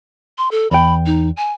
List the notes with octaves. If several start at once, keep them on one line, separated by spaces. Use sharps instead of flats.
C6
A4
E2 G5 B5
D#4
G#5